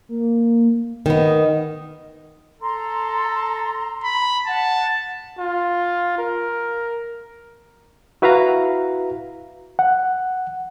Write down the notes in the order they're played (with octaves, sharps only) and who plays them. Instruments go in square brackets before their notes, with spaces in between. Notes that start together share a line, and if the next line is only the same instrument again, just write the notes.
[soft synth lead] A#3
[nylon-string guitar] D#3 B3 [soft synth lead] D#5
[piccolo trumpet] A4 [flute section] A#5 C6
[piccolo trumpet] B5
[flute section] F#5 [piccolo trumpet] A5
[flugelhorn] F4
A#4
[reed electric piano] E4 F#4 B4 E5 F5 A#5
F#5